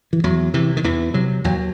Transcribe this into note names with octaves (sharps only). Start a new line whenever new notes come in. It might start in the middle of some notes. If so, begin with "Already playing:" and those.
E3
E2 F#3
C3 E3
D#3
E2 E3
C3 F#3
D#2 F#3